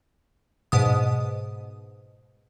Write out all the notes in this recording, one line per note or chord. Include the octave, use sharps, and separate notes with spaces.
G#2 B2 D#6